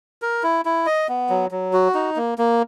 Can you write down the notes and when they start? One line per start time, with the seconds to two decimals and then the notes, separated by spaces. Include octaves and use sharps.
0.22 A#4
0.43 E4
0.65 E4
0.86 D#5
1.09 B3
1.29 F#3
1.51 F#3
1.73 F#4
1.94 D#4
2.16 A#3
2.38 A#3